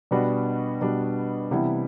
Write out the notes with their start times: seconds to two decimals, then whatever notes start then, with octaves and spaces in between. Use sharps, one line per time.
0.11 B2 G3 B3 D4 F#4
0.81 B2 G3 B3 D4 F#4
1.51 C3 E3 G3 B3 E4